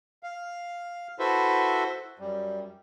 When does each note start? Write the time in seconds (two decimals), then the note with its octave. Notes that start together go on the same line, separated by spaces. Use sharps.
0.23 F5
1.19 E4 F#4 A4 B4 C5 E5
2.19 F#2 G3